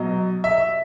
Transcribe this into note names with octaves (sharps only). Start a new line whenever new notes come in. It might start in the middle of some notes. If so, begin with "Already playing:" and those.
Already playing: B2 F#3 D#5
E5